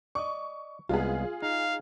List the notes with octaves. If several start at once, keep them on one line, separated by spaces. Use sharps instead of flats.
D5 D#5 C#6
C2 G#3 B3 F4 G#4
D#4 F5